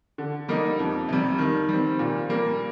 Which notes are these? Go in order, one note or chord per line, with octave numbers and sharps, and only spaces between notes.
D3
G3 A#3 D#4
F2
C3 G3
D#3
G3 C4
A#2
G3 A#3